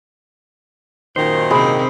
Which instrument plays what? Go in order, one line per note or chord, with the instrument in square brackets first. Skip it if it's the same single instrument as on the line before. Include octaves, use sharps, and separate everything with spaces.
[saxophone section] F#2 A#2 D#3 [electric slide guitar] C5
[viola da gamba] C3 C4 [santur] G#3 B5